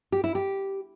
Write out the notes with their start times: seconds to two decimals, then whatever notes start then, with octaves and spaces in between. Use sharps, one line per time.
0.12 G4
0.24 E4
0.35 G4